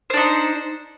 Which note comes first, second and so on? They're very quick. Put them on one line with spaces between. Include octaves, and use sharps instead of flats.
C5 D4 D#4